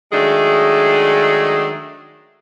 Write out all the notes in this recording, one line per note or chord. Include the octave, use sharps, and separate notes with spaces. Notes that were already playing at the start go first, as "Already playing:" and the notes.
D#3 F#3 G#3 A3 D4 G#4